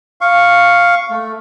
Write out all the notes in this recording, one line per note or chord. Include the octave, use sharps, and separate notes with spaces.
F5 C#6
A3